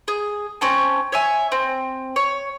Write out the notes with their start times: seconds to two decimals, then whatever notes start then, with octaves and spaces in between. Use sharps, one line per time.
0.08 G#4
0.61 C4 C#4 A5
1.12 C#5 E5 G#5
1.52 C4
2.16 C#5